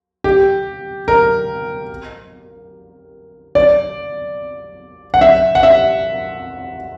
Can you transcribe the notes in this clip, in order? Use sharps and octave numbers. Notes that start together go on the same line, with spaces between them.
G4
A#4
D5
F#5
E5
F#5
E5